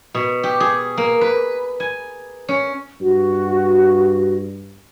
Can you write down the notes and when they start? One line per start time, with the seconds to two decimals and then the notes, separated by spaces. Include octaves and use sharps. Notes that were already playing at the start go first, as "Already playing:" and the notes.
0.14 B2
0.43 G4
0.60 G#4
0.97 A#3
1.21 B4
1.80 G#5
2.48 C#4
3.00 G2 F#4